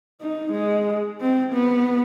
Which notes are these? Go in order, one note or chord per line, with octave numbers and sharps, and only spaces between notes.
D#4
G#3
C4
B3